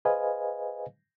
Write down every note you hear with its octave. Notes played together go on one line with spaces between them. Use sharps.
G#4 B4 C5 D#5 F5 G#5